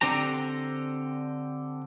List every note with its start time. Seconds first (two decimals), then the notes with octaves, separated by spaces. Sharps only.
0.01 D3 C4 D4 G4 A#5